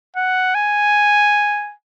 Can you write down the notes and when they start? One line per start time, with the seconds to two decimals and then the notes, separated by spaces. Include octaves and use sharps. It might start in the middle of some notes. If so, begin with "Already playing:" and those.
0.16 F#5
0.55 G#5